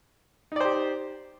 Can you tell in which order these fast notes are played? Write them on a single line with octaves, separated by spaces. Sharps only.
D#4 D5 C5 G4